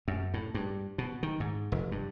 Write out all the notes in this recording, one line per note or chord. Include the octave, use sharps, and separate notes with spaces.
F#2
A2
G2
B2
D#3
G#2
F1
G2